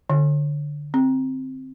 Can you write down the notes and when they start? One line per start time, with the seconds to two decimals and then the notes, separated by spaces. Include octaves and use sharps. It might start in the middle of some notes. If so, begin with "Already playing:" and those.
0.10 D3
0.94 C4